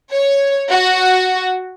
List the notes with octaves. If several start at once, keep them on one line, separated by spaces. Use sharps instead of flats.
C#5
F#4